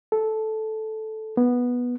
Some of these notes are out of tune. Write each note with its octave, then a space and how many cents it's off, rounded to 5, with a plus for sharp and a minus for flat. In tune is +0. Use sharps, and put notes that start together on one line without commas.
A4 -10
B3 -10